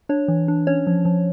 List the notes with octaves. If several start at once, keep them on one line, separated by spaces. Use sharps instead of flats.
D4 C#5
E3
D4
C#4 C#5
F3
F3